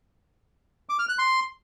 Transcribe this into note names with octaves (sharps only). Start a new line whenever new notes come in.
D6
F6
F#6
C6